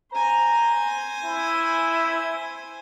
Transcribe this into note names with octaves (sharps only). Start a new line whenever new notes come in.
C5 G#5 A#5
E4